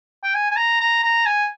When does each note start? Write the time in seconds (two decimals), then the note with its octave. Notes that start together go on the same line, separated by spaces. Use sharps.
0.23 G5
0.34 G#5
0.51 G#5
0.56 A#5
0.81 A#5
1.03 A#5
1.26 G#5